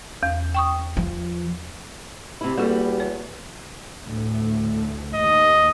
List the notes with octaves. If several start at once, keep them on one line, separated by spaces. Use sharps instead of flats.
E2
G5 C#6 D#6
F3
C3 E4 G4
E2 G3 A#3 E4 F#4 A4
C#5
D2 A2 A3
D#2 D#5